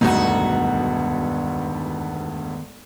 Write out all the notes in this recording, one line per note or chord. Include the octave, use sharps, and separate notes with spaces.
E1 D2 G2 D#3 B3 D#4 F#4 A4